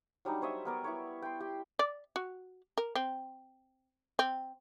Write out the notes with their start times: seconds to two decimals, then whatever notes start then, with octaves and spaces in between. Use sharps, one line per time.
0.25 F#3 G3 D4 D#4
0.42 C5 C#5 D#5 E5
0.65 B3 A#4 D5
0.84 E4 B4 C#5
1.22 G5 C6
1.40 G4
1.79 D5
2.16 F#4
2.78 A#4
2.96 C4
4.19 C4